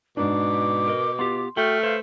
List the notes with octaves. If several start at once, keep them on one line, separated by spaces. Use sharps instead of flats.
G#2 B2 D4 D6
A#4 D#5
B3 F4 G4 C6
A3 F#4 G5 F6
B4 C5 F5